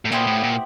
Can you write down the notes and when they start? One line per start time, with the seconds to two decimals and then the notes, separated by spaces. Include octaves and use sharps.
0.05 A2
0.11 A#2 B3 E4 G4 C5
0.27 A2
0.43 A#2